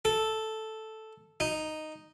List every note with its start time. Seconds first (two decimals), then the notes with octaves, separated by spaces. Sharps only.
0.05 A4
1.40 D#4